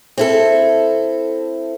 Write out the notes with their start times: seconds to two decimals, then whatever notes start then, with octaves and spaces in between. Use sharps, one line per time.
0.18 C4 E4 A4